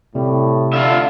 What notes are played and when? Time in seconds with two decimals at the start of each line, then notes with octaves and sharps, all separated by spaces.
0.15 A2 C3 G3
0.73 D3 F4 E5